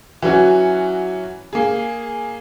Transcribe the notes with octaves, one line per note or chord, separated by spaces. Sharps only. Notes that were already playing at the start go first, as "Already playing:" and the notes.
E3 F#3 C#4 F#4
A#3 G#4